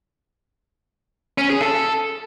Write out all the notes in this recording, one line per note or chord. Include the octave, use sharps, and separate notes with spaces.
C#4
G#4
A4